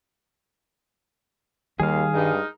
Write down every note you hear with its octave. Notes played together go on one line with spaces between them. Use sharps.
D#2 D#3 G3 G#4 F5
G2 G#3 D#4 A#4